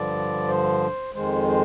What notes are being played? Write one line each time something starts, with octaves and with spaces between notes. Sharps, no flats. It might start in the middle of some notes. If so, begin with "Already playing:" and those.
Already playing: G2 D3 F3 D5
C5
F2 D#3 G#3 C5
C5